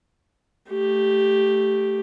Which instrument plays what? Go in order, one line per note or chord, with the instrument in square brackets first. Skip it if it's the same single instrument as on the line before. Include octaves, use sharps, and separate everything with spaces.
[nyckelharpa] A3 G4